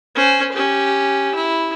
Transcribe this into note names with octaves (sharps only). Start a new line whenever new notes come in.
C#4 C5
C#4 G4
E4